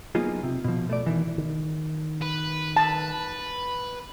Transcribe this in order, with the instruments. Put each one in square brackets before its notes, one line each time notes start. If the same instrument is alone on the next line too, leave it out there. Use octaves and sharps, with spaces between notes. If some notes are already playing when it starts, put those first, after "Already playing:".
[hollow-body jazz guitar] F#3 A#3 B3 D#4 F4 G#4
C3
B2 F3
A3 D5
B2 D#3 E3
[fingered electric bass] D#3
[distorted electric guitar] B4
[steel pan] A5